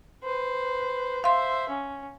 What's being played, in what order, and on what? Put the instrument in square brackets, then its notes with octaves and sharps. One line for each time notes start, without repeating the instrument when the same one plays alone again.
[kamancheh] B4 C5
[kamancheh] C5 E5 [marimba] F5 C6
[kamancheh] C#4